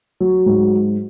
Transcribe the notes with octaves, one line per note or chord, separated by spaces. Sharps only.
F#3
G#2